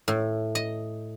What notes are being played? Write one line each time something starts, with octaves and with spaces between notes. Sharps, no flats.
A2
D#5